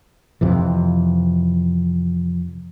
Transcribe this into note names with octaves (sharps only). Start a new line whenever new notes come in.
F2 C3 E3